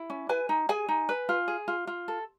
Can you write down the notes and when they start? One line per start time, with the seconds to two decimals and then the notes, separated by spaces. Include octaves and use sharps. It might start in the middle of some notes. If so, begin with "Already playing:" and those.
Already playing: E4
0.10 C#4
0.29 B4 G#5
0.49 D#4
0.69 G#4 G#5
0.89 D#4
1.09 B4
1.29 F4
1.48 G#4
1.68 F4
1.87 F4
2.08 A4